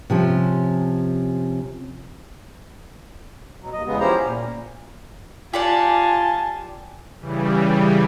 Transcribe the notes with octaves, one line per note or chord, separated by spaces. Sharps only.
C3 F3 C#4
B2 F#3
D#2 D#5
E2 C#3 G#3 B3
F3 C#4 E4 G4 C5 A#5
A#2
F4 G4 D5 F#5 G#5 A5
C#3 E3 G3